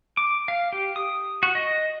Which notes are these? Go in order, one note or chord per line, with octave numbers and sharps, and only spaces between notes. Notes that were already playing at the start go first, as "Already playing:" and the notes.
D6
F5
G4
D#6
F#4
D#5